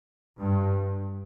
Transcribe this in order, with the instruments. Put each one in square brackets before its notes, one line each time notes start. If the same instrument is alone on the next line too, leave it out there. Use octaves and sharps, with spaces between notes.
[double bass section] G2